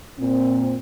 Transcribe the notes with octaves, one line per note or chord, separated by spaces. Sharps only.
A#2 C4